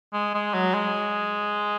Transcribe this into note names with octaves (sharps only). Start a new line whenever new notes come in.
G#3
G#3
F#3
G#3